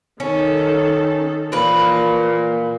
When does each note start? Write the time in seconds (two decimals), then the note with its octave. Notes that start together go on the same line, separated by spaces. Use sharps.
0.20 D#3 C#4 A4
1.52 A#2 E3 F3 A#3 B4